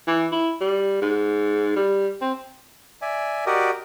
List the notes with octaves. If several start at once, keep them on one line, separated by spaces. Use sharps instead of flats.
E3
E4
G3
G#2
G3
C4
D5 E5 G#5
F#4 G4 A#4 D5 D#5